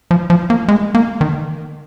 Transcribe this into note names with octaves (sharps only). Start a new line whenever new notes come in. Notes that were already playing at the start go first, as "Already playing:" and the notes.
F3
F3
A#3
G#3
A#3
D#3